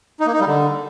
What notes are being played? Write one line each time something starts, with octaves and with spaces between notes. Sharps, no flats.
D#4
A#3
D#4
G3
D3